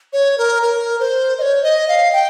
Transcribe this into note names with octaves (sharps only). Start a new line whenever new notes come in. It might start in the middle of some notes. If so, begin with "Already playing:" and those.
C#5
A#4
A#4
C5
D#5
C#5
D#5
F5
G5